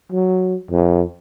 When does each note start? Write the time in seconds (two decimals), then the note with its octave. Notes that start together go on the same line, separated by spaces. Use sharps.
0.12 F#3
0.71 F2